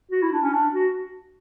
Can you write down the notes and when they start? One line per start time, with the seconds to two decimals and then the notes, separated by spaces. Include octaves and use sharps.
0.11 F#4
0.22 E4
0.32 D4
0.43 C#4
0.53 D4
0.73 F#4